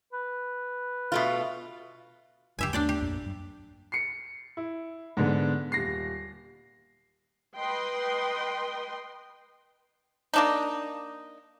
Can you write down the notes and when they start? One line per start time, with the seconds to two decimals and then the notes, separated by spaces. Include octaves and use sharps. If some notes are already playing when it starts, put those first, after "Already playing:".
0.13 B4
1.12 B2 A3 F4
2.59 D1 C#2 F#2 G4 E5 G#5
2.73 D#2 A3 B3 D4 D5 G5
2.89 G4
3.01 A#1 F2 A#3
3.22 A1 F#2
3.92 C7 C#7
4.57 E4
5.17 G#2 D3 B3
5.72 D#1 A#6 C7
7.56 B4 D#5 G5 C6
10.34 A#3 D4 D#4